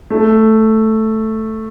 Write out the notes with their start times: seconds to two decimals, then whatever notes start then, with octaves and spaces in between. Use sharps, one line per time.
0.10 A3